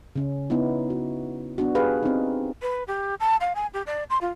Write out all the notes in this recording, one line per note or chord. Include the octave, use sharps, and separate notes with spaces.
C#3 C#4
B3 D#4 E4
F#4
B3 D4 F#4
G4 G#4 B4 F5
C4 D#4
B4
G4
A5
F5
G#5
G4
D5
C6
F4